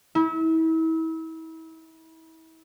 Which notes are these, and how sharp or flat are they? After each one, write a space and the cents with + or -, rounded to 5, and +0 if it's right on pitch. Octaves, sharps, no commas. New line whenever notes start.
E4 -35